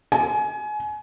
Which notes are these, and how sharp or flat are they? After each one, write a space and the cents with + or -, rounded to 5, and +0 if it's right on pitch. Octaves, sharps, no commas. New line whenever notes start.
G#5 +30